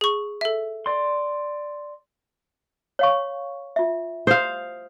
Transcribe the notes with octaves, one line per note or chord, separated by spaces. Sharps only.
G#4 C#6
A4 E5
D5 C6
C#5 F5 C#6
F4 E5
C5 F5 D#6